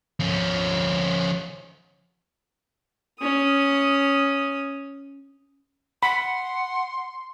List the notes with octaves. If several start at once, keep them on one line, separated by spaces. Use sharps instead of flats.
F3 C#4
C#4 D#6
F#5 B5 C6